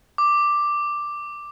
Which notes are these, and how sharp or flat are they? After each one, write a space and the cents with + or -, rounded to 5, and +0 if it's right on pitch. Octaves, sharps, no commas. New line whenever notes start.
D6 +5